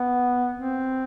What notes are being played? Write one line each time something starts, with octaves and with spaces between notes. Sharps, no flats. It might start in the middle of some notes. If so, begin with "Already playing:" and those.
Already playing: B3
C4